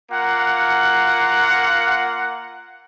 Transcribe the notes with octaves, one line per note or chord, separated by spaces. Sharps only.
A#3 F4 F#5